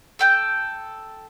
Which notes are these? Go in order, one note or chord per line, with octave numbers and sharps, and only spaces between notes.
A4 G5 G6